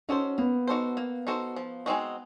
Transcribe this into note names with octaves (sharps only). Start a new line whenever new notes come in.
C#4 D#4 F#4 A4 C5
A#3 B3
D#4 F#4 A4 C5
A#3
D#4 F#4 A4 C5
F3
G#3 C4 D#4 F#4